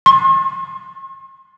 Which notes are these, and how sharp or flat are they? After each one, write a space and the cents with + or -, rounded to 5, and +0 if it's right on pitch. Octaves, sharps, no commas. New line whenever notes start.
C6 +45